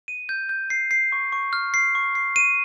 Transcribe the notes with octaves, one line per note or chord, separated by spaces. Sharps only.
D#7
G6
G6
C7
C7
C#6
C#6
F6
C7
C#6
C7
D#7